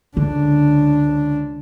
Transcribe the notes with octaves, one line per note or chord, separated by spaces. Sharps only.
C#2 D3 D4